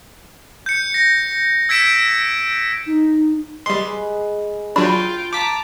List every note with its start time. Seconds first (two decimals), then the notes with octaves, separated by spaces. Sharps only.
0.66 G6 C#7
0.94 A#6
1.69 E6 G#6 B6 D7 E7
2.87 D#4
3.66 G3 G#3 G#4 B4 C6
4.76 F#3 D4 F4 G5 B5
5.33 A5 A#5 D6 B6